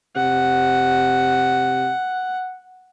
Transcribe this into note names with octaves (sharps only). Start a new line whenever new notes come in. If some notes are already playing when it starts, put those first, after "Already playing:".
C3 F#5